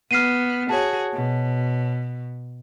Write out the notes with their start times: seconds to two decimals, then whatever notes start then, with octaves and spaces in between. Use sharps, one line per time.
0.11 B3 F6 C7 D#7
0.69 F#4 G#4 C#5 A5
1.14 B2